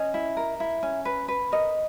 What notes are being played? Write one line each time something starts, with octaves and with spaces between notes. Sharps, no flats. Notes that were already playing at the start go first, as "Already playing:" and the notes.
Already playing: C#4 D#5
E4
A#4
E4
C#4
B4
B4
A#4 D#5